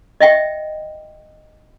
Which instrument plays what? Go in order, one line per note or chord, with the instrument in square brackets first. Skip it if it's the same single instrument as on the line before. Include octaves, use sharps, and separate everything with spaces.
[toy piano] D#5 E5 G5